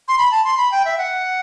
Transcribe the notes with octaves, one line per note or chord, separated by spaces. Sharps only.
C6
B5
A5
C6
B5
G5
E5
F#5